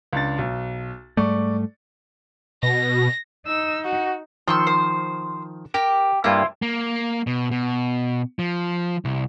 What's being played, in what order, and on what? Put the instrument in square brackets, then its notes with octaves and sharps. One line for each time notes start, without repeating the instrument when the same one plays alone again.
[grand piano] C#2 D4 A6
B1
[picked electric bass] G#2 G3 A3 [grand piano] D5 C#6
[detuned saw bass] B2 [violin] A#6
[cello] D#4 [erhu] E6
[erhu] F#4 [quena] F#5
[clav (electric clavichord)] D#3 F3 [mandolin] C6 C#6 E6
[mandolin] C5
[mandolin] G4 [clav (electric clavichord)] A#4
[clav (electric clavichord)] G2 G3 A#3 [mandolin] E4 F4
[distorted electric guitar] A#3
B2
B2
F3
C2